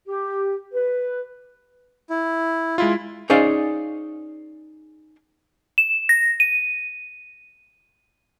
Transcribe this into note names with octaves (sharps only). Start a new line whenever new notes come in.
G4
B4
E4
G#3 E4 F4
C#4 D#4 G#4 C5 D5 F5
E7
A#6
D#7